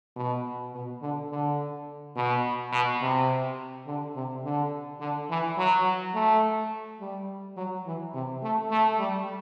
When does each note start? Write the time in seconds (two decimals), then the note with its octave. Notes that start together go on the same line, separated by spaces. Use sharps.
0.16 B2
0.74 B2
1.01 D3
1.31 D3
2.16 B2
2.72 B2
3.02 C3
3.87 D3
4.16 C3
4.44 D3
5.00 D3
5.30 E3
5.58 F#3
6.15 A3
7.01 G3
7.57 F#3
7.86 E3
8.14 C3
8.43 A3
8.71 A3
8.99 G3